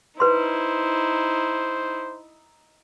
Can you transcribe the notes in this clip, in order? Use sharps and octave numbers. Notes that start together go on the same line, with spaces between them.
D#4 E4 B4 C5 C6